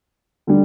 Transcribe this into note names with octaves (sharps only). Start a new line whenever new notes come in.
D3 G3 D4